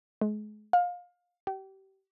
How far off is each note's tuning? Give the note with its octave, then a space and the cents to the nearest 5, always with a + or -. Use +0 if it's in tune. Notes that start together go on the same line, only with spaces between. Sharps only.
G#3 +35
F5 +25
G4 -30